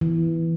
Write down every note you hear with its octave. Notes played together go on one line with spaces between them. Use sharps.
E3